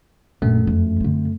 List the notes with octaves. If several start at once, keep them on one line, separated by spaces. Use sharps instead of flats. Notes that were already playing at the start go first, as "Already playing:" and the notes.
A#1 F#2 A3
F2 E3
D3 C4